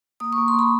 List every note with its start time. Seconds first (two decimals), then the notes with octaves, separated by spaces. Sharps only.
0.20 A#3 D#6
0.33 C#6
0.38 A#3
0.48 C6
0.54 A#3
0.59 B5